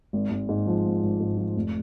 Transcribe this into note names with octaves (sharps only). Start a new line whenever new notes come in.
G#1
G#1
G#2
F3
G#1
G#1
G#2
F3
F1